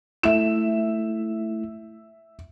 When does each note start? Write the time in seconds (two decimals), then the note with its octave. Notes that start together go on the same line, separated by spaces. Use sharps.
0.23 A3 E4 E5 E7